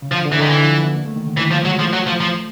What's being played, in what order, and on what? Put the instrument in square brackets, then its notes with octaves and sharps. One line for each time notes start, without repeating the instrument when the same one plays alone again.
[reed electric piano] C#3
[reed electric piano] D3 [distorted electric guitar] F3
[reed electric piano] D3
[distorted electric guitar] E3
[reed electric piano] D3 [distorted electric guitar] D#3
[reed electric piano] D3 [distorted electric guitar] E3
[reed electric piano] F3
B3
A#3
A3
D#3
D3
[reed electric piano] D#3 [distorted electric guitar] E3
[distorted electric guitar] F3 [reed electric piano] G3
[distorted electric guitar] F#3 [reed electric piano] G#3
[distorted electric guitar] F3 [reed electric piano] A3
[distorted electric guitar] F#3
F3
F3